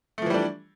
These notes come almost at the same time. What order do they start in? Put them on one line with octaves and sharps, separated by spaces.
A3 F3 E3 G3 D4